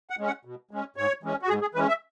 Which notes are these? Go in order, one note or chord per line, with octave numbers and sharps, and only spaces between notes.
F#5
G#3 C#4
F#5
B2
G#3 C#4
G#2 C#5
E3 G#3 C#4
F#4
G#2 G#4
G#4
E3 G#3 C#4 B4
E5